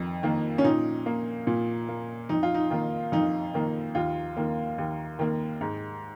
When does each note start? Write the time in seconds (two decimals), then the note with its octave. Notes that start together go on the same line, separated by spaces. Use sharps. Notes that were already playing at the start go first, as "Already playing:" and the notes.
Already playing: F2 D#3
0.23 D#3 A#3
0.58 C#4
0.64 A#2 D#4
1.06 A#3
1.47 A#2
1.89 A#3
2.29 F2 D#4
2.43 F4
2.54 D#4
2.70 D#3 A#3
3.12 F2 D#4
3.54 D#3 A#3
3.95 D#2 F4
4.37 D#3 A#3
4.78 D#2
5.19 D#3 A#3
5.61 G#2